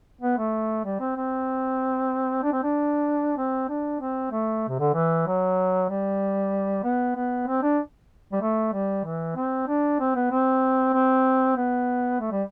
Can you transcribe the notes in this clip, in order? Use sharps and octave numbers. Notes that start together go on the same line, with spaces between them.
B3
A3
G3
C4
C4
D4
C4
D4
C4
D4
C4
A3
C3
D3
E3
F#3
G3
B3
B3
C4
D4
G3
A3
G3
E3
C4
D4
C4
B3
C4
C4
B3
A3
G3